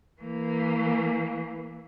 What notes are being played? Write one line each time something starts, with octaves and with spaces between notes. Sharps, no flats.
E3 A#3